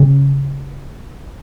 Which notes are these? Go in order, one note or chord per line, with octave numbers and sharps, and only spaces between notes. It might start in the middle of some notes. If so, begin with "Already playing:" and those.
Already playing: C#3